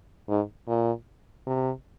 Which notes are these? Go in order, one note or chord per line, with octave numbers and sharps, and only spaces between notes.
G#2
A#2
C3